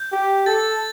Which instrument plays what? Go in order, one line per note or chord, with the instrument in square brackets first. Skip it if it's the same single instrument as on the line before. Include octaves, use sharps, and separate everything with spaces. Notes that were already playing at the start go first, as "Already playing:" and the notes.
Already playing: [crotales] G6
[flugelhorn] G4
[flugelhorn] A4 [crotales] A6